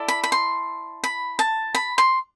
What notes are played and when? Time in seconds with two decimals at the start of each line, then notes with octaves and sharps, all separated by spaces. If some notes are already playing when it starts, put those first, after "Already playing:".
Already playing: E4 A4 D5
0.08 B5
0.24 B5
0.32 C6
1.04 B5
1.39 A5
1.75 B5
1.98 C6